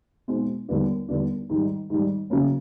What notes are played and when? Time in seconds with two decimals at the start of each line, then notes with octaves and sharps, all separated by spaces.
0.28 B2 G#3 C4 D#4
0.69 D#2 D3 G3 B3 D4
1.08 D#2 D3 G3 B3 D4
1.50 G#2 D#3 G3
1.90 G#2 D#3 G3
2.30 C#3 F#3 A#3 C#4